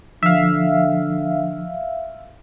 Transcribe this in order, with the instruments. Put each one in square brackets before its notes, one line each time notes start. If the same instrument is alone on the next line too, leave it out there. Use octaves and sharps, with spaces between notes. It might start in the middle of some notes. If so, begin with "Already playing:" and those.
[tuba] D3 [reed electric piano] F3 [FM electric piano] E5 F5